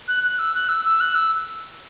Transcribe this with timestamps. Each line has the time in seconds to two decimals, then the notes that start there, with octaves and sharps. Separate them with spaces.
0.08 F#6
0.24 F#6
0.39 E6
0.55 F#6
0.69 E6
0.85 E6
1.00 F#6
1.15 E6